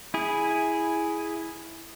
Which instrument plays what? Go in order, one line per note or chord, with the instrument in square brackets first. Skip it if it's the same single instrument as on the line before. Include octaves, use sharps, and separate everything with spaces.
[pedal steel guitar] E4 G#4